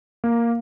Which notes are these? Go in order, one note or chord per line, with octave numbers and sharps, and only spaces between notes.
A#3